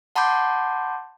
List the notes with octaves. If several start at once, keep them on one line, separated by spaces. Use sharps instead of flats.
F#5 A5 B5 C6 D6 G6